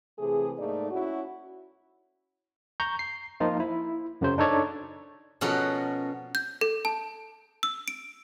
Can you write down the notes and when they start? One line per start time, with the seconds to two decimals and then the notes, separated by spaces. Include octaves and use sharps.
0.19 C3 E3 A3 G#4
0.59 G#2 A3 A#3 D#4 D5
0.91 C#4 E4 F#4
2.80 A#5 C#6 G6
2.99 C7
3.40 F3 A#3 D#4 F4
3.60 E4
4.21 F#2 C#3 F#3 C5
4.38 D4 D#4 A4 C#5 D5
5.41 B2 F3 C#4 F#4 A4 A#4
6.35 G6
6.61 A4
6.85 A5
7.63 E6
7.88 D7